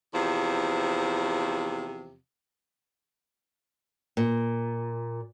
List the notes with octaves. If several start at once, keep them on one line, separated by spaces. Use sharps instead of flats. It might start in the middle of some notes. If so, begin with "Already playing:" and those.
E2 C3 F3
A#2